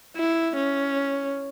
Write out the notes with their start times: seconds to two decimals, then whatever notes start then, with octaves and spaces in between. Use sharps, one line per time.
0.16 E4
0.57 C#4